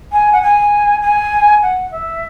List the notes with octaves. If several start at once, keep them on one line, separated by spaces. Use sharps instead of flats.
G#5
F#5
G#5
G#5
F#5
E5